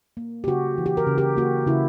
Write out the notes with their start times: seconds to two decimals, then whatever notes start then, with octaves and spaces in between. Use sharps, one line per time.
0.17 A#3
0.44 G4
0.47 C#3 F#4
0.78 E3
0.86 G4
0.97 A#4
1.07 C#3
1.18 G4
1.37 A#3 F#4
1.67 C#3 E4